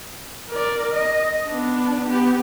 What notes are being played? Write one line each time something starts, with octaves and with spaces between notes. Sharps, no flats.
A#4 D5
D#5
B3 D4
B3 G4